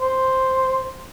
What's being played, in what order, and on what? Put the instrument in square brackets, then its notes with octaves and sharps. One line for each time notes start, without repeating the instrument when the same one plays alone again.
[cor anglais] C5